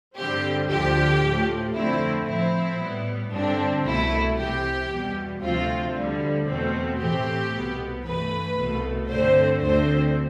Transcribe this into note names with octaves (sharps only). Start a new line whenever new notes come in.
G2 D3 G3 C4 G4
D2 D3 F3 G4
A2 F3 A3
F2 D3 A3 C4 E4
A2 F3 C4 E4
A2 G3 B3
G2 D3 G3 C4 D4
C2 B2 A3 E4
C2 C3 E3 G4
E2 B2 G3
D2 C3 F3 A3 C4 F4
D2 D3 G3
E2 B2 A3 C4
A2 E3 A3 C4 G4
C2 B2 B3
G2 E3 A3 B4
C2 B2 A3
G2 D3 A3 C4 C5
D2 D3 A3 C4 C5